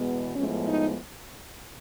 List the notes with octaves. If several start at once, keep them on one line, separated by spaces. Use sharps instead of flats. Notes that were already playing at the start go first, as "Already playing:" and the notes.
Already playing: E2 B2 G#3 B3
A2 F3 G#3 B3 C#4
D#4